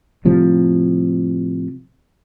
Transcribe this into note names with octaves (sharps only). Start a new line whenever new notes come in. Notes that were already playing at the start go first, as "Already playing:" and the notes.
A2 C3 F3 G3